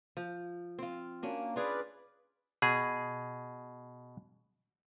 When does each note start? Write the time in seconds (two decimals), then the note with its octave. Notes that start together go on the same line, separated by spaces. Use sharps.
0.17 F3
0.79 C4 F4
1.23 A#3 C#4 D4 F#4
1.56 F4 G#4 B4 D5 F5
2.62 B2 G#4